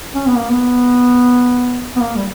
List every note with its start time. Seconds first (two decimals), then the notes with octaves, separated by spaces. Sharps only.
0.14 C#4
0.26 B3
0.37 A#3
0.50 B3
1.96 B3
2.01 A#3
2.16 G3